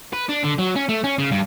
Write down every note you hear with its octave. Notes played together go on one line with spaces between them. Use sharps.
B4
D4
D3
F#3
C#4
A3
C#4
C#3
G2